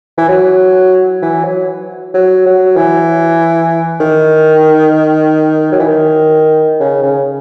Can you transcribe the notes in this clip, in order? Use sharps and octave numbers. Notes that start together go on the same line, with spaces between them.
E3
F#3
E3
F#3
F#3
F#3
E3
D#3
F#3
E3
D#3
C#3
C#3